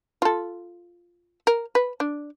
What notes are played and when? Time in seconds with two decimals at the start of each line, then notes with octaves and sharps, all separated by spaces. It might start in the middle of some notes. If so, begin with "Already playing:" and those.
0.22 F4 A4
1.47 A#4
1.75 B4
2.00 D4